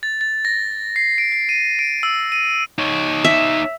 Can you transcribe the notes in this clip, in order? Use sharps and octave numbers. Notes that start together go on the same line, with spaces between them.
A6
A6
A#6
C7
D7
C7
D#7
D7
E6
D#7
D#4 C#5
E5